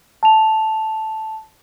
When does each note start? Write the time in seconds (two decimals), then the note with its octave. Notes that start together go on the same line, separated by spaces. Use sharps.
0.23 A5 F7